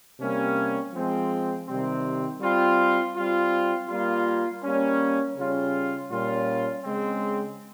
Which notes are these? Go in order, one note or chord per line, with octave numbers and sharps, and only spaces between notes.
C3 G3 A#3 C#4
F3 G#3 C4
C3 D#3 G3 C4
G3 C4 F4
G3 C4 F4
G3 A#3 F4
G3 A#3 C#4
C#3 G3 C#4 F4
A#2 G3 C#4 F4
C#3 G#3 C4